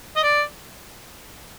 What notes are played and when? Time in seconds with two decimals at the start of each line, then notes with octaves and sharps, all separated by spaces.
0.16 D#5
0.24 D5